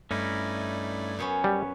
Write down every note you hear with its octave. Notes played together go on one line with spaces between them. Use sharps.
G2 A3 C#4 D#4 E4 D5
F#2 B3 C#4
G3